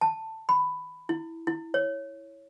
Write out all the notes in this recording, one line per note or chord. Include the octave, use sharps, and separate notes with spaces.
A5
B5
E4
E4
C#5